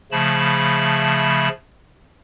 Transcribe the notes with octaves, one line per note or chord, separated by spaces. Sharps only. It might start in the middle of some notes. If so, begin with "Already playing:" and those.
C#3 F3 A3 A5 B5